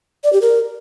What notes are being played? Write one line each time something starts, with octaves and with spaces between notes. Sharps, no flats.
D5
G4
A#4